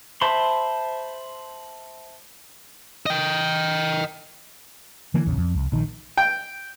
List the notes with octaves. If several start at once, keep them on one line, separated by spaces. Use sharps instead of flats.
C5 E5 A5 B5 C6
D#5 G5
D3 E3 A#3
A#1 E2 C#3
F2
C2
A#1 D#3
G5